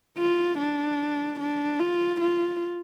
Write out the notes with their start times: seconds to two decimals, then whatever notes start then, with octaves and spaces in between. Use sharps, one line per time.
0.17 F4
0.58 D4
1.39 D4
1.80 F4
2.21 F4